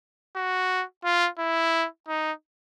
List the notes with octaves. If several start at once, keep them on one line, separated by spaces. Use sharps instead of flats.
F#4
F4
E4
D#4